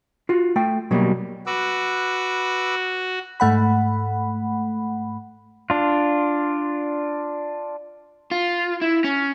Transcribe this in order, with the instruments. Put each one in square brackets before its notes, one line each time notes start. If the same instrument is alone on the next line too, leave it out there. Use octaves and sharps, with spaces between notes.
[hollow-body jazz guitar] F4 F#4
A3 G5
B2 F#3 G3 A#3
[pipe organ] F#4 [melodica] B4 D6 E6
[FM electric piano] G#2 A3 F#5 B5
[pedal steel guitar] D4 F4
[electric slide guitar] F4
E4
C#4